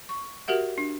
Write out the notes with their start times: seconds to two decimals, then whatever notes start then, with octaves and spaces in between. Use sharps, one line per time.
0.09 C#6
0.48 F#4 G4 A#4 E5 F#5
0.78 D4